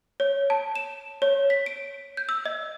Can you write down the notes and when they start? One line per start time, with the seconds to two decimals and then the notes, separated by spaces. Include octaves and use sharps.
0.20 C#5
0.50 A5
0.76 E7
1.22 C#5
1.50 B6
1.66 D7
2.17 G6
2.29 E6
2.46 D#5